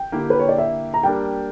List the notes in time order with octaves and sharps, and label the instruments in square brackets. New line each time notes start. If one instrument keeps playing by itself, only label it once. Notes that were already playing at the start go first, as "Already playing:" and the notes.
Already playing: [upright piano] G5
[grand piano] D3 A#3 E4 G4
[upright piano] B4
C#5
D5
E5
A#5
[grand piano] G3 A#3 D4 G4 A#4 [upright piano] G5